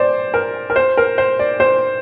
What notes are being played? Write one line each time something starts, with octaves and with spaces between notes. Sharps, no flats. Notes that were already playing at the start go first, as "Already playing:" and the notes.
Already playing: C5 D5
A#4
A#4
C5
A#4
C5
D5
C5